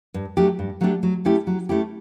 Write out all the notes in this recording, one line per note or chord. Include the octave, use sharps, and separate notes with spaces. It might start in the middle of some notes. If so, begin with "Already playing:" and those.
G2
F#3 A3 D4 G4
G2
F#3 A3 D4 G4
F#3
A3 C#4 E4 G4
F#3
A3 C#4 E4 G4